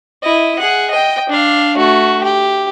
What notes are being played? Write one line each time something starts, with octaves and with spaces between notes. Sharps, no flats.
E4 D#5
G#4 F#5
D#5 G5
D4 F5
A3 F#4
G4